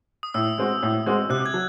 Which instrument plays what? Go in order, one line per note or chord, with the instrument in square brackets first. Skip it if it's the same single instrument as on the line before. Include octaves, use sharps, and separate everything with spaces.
[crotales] D#6
[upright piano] A2 [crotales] E6
[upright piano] G#3 C4 F#4
A2
G#3 C4 F#4
[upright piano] C3 [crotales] F#6
[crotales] G#6
[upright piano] F#3